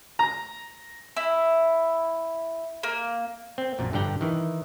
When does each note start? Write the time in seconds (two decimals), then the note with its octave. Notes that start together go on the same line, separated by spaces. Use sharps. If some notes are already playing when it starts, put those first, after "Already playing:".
0.19 A#5
1.17 E4
2.83 A#3
3.58 C4
3.79 A#1 F#2 A#2
3.93 G2 D3 D5 G5 A#5
4.21 D#3 E3